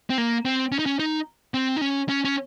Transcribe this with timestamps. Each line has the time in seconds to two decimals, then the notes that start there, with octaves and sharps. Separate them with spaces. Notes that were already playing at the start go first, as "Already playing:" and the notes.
0.10 C4
0.18 A#3
0.45 C4
0.72 C#4
0.79 D#4
0.86 C#4
0.99 D#4
1.54 C4
1.76 D#4
1.81 C#4
2.09 C#4
2.25 C#4